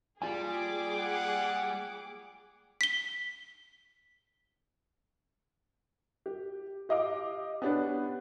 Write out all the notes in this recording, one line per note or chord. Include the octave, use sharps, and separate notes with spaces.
G3 A#3 F4 G#4 G#5 D6
F#5
B6 G7
G4
G4 D#5 F5 D6
B3 C#4 D4 G4 B4